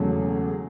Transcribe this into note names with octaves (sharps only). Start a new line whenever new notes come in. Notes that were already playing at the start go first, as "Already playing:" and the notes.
Already playing: E1 E2 C#3 F#3 A3